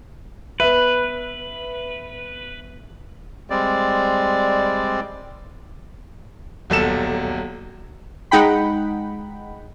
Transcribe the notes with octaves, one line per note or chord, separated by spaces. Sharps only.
B3 B4 E5
G3 G#3 C4 D5
D#1 B1 A4 E7
G#3 D#4 F#5 G5 B5